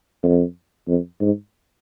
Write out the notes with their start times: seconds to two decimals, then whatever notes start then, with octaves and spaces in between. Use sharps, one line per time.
0.23 F2
0.88 F2
1.21 G#2